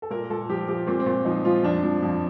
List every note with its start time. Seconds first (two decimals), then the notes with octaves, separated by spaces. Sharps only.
0.02 A4
0.10 A#2 A#4
0.30 A#2 A4
0.49 F3 G4
0.68 F3 G4
0.87 A#2 C4
1.00 C4
1.06 A#2
1.25 F3 D#4
1.45 F3 F4
1.63 F2 D4
1.83 F3
2.03 F2